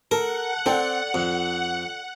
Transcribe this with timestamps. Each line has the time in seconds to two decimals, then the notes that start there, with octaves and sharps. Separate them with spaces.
0.11 A4 A#4 F#5
0.66 C4 A4 D5 G5
1.14 F2